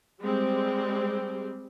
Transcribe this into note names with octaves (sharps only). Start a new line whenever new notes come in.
G3 G#3 C4